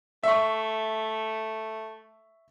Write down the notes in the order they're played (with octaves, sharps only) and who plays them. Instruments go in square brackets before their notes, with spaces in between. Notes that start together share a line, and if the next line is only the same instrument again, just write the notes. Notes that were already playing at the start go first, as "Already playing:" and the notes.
[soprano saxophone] A3 [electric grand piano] E5 C#6